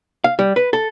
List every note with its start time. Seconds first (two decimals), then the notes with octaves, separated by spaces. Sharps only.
0.24 F5
0.39 G3
0.56 B4
0.73 A4